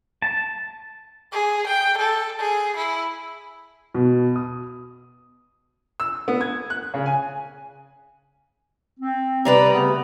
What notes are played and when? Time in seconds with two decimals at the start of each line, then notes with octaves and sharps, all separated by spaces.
0.22 A5
1.32 G#4
1.67 G5
1.97 A4
2.39 G#4
2.77 E4
3.95 B2
4.36 D#6
6.00 E6
6.28 B3
6.41 G#6
6.70 F#6
6.94 C#3
7.06 G#5
9.00 C4
9.45 C3 G3 B4 D5 A#5
9.72 C#3 A3 B3